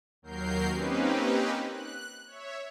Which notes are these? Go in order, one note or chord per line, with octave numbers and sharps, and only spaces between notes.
D#2 F#3 A#4 G6 C7
A#3 C4 C#4 D#4 G4 B4
F#6
C#5 E5